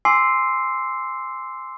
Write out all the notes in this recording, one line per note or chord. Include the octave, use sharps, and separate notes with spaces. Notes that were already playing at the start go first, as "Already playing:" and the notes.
G#5 C6 D6 E6 C7